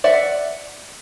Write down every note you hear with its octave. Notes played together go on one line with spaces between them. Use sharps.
D5 E5 F#5